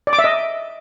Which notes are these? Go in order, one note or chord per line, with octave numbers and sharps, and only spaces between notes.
D5
D6
E5
D#5